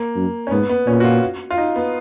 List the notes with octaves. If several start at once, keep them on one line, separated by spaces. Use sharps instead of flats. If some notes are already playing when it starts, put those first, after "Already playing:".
Already playing: A#3
F#2
C#4
G#2 B3
B3
A#2 C#4
F#4
F4
F4
D#4
B3